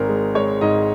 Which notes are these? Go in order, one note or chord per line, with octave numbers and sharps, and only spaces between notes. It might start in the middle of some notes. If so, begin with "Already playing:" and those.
Already playing: G#1 A#4
G#3
G#3 C#5
G#2 D#5